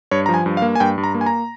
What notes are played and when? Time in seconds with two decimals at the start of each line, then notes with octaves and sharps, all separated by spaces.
0.11 G2 C#5
0.26 A#5
0.29 F3
0.34 G#5
0.46 G2
0.57 F5
0.62 A#3
0.75 G#5
0.80 G2 G5
0.98 G2
1.04 A#5
1.14 A#3
1.21 G#5
1.26 A#5